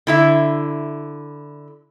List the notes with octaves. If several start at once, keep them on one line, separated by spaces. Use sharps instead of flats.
D3 E4 E5